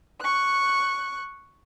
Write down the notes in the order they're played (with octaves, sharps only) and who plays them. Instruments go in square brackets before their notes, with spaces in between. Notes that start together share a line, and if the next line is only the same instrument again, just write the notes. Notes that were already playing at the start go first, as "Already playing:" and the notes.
[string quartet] C#6 F#6